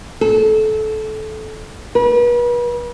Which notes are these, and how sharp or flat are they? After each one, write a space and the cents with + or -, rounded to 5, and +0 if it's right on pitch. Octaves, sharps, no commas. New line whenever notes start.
A4 -20
B4 -40